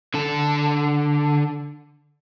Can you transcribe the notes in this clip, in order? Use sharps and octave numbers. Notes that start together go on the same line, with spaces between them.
D3 A4